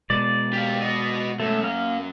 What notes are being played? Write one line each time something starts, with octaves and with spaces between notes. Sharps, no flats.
B2 G#3 D5
G4 F5
F#4 D#5
F#2 A3
A#3 F6